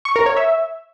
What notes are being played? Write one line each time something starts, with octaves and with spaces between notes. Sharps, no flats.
C#6
A#4
C#5
E5